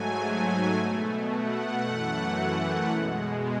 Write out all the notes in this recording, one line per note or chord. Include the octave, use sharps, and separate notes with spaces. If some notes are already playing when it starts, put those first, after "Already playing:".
Already playing: G#2 F#3 A3 G#5
G#5
B2 A3
F#5
F#2 E3 A3
B2 G#3